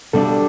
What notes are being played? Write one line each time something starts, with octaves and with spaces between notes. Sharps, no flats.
B2 G3 D4 G4 A4